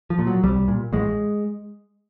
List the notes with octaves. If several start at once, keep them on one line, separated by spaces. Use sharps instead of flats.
F3
A#2
F#3
C2 G3
A#2
A1 G#3